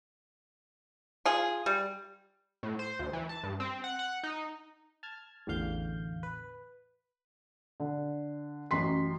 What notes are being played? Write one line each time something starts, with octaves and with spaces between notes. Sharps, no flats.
F4 G#4
G3
A2
C5
D2
E3
A5
G2
C4
F#5
F#5
D#4
A5 F6 G#6
A1 E2 D3 F5 G6
B4
D3
A1 F#2 C6 B6